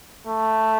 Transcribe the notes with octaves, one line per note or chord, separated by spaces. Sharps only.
A3